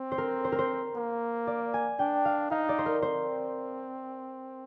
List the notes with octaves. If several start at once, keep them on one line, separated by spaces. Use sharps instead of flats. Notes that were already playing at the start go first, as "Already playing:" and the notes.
Already playing: C4
C5
A#4
C5
A#4
C5
A#3
D5
G#5
D4 G5
F5
D#4 F5
D5
C5
A#4
C4 C5